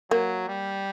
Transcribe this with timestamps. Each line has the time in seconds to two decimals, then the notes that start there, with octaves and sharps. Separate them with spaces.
0.11 F#3 A#3
0.48 G3